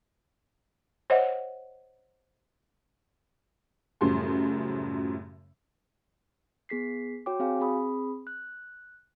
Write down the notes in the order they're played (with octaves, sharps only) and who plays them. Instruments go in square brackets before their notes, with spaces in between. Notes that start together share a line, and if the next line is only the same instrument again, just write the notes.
[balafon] C5 C#5 D#5 E5 F#5
[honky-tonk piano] F#2 A2 C#3 F3 G3 C6
[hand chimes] B3 G#4 B6 C7
F#4 C#5 G5 D6
C4 F#4 G#4 F5 G#5
C4 G#4 B5 D#6
F#6